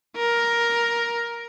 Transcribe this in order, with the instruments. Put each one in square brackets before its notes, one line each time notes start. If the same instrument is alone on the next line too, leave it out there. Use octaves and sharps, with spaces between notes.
[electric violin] A#4